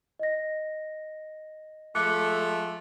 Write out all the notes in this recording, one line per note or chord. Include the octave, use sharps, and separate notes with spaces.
D#5 A#6
F3 G#3 A3 D6 F#6 C#7